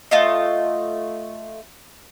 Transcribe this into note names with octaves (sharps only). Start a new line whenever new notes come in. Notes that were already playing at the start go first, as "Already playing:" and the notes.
A3 F4 D#5